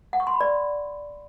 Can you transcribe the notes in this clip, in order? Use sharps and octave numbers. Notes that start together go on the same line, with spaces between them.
F#5
C#6
C6
B5
D5